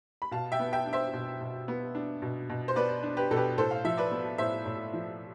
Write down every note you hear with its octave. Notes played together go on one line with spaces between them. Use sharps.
B5
B2 F5 A5
E5 G5
B3
E5 G5
D4
C5 E5
B2
B2
B3
D4
B2
B2
C5
B3 B4 D5
D4
G4 B4
B2 A4
G4 B4
A2 A4 C5
F5
F3 E5
B4 D5
B3
A2 C5 E5
A2
F3